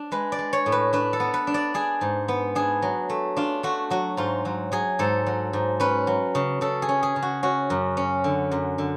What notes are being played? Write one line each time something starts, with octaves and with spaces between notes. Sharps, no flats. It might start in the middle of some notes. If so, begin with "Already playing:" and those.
Already playing: D4
G#3 B4
D5
G#3
C#5
A2
B4
D4 B4
A4
B3
B4
D4
D5
D4 G#4
G#2
B3
D4 G#4
F#3
A3
D4 F4
A3 F#4
F#3 F#4
G#2 F4
F#3
F#3 G#4
G#2 A4
F#3
G#2
C#4 B4
F#3
C#3
C#3 A4
G#4
C#4
G#4
C#3
F#4
C#4 F#4
F#2
C#4
D3
F#2
D3